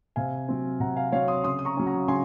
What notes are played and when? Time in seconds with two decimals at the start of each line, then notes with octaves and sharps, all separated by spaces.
0.16 C3 F5 G#5
0.48 F#3 C4
0.80 C3 F#5 A#5
0.96 F5 G#5
1.12 F#3 C4 C#5 F5
1.28 C6 D#6
1.44 C#3 C6 D#6
1.59 D#6
1.65 A#5 C#6
1.77 F#3 C#4
1.86 F#5 A#5
2.08 C#3 G#5 C6